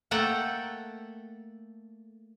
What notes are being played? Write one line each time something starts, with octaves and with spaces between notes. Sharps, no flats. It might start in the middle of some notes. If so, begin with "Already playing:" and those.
A3 A#3 A4 F#5 G5